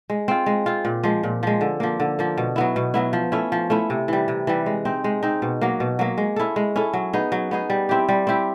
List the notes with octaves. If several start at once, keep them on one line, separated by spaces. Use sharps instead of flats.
G#3
C4 F4
G#3
C4 F4
A#2
F3 G#3
A#2
F3 G#3
D3
F3 A#3
D3
F3 A#3
B2
F#3 B3 E4
B2
F#3 B3 E4
F3
A3 C#4 E4
F3
A3 C#4 E4
C3
E3 G3
C3
E3 G3
G#3
C4 D#4
G#3
C4 D#4
B2
F#3 A#3
B2
F#3 A#3
G#3
C#4 E4 A4
G#3
C#4 E4 A4
F#3
B3 D#4 G#4
F#3
B3 D#4 G#4
G3
C4 E4 G4
G3
C4 E4 G4